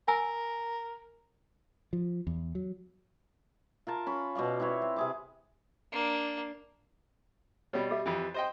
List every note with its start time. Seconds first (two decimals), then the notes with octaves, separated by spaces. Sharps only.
0.08 A#4 G#5 E6
1.93 F3
2.27 E2
2.55 F#3
3.87 F4 A#4 A5
4.07 C#4 B5
4.35 B2 C#4 D5 F5
4.60 C4 E4 B4 C#5
4.82 C4
4.96 C3 G#4 D6
5.92 A#3 D4
7.73 B2 G3 C#5
7.91 G4 E5
8.06 F2 E3
8.34 C5 D#5 G5